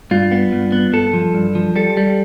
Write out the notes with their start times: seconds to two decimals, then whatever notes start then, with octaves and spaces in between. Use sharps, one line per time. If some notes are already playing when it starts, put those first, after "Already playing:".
0.11 G2 F4
0.32 B3
0.52 G2
0.72 B3
0.93 G2 A4
1.13 F3
1.35 G2
1.55 F3
1.76 G3 A4
1.97 G3